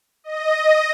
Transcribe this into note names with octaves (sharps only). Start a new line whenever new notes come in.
D#5